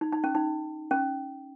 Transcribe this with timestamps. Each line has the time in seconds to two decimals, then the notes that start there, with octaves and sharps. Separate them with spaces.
0.01 D#4
0.13 D#4
0.24 C#4
0.35 D#4
0.91 C#4